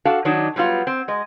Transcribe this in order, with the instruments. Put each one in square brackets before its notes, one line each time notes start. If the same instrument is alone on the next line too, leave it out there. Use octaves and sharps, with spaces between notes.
[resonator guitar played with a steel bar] D4 F#4 A4 F5 A5
D#3 F#3 D4 D#4
F#3 G3 B3 F4
C4
G#3 D#5